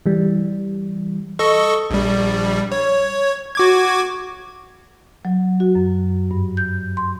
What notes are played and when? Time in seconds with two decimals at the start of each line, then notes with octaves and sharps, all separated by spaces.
0.06 E3 G3
1.39 A4 D#5 C#6
1.90 A#1 G3
2.72 C#5
3.55 F#4 D6 G#6
5.25 F#3
5.60 F#4
5.75 F#2
6.31 G2
6.57 G6
6.97 C6